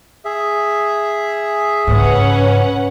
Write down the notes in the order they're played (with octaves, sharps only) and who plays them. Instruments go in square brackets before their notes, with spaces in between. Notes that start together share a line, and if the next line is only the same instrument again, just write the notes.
[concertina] G#4 E5
[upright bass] G#2 C#3 [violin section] C#4 B4 F#5